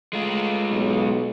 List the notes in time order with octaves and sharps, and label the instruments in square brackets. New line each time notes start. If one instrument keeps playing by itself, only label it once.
[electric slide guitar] G#3 F4 [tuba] A3
[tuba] B1